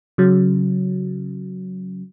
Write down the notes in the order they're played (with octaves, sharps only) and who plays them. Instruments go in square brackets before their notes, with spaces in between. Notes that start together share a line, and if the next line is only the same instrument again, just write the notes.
[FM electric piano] C#3 F#3